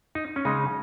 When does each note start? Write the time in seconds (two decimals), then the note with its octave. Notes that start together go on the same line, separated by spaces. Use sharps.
0.15 D#4
0.36 C#4
0.45 C#3 G#3 D#4